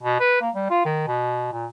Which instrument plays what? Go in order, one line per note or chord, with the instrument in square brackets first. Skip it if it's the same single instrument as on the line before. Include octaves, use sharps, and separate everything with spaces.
[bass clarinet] B2
B4
A#3
G3
F4
D#3
B2
A#2